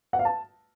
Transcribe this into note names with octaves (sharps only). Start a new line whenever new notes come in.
F#5
F5
A5